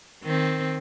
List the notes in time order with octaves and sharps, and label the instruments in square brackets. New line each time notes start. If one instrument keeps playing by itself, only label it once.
[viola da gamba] D#3 C4